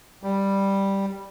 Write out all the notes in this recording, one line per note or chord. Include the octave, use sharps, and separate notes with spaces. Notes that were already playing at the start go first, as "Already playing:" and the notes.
G3